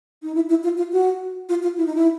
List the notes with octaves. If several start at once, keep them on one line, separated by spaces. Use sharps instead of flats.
D#4
E4
E4
F4
F4
F#4
F4
F4
E4
D#4
E4